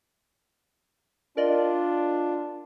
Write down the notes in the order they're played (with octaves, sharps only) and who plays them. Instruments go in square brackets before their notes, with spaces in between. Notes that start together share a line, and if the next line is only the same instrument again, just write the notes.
[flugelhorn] D4 [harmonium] F4 [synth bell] A#4 D5 D#5